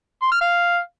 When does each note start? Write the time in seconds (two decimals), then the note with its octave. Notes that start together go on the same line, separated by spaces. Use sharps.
0.22 C6
0.32 F6
0.41 F5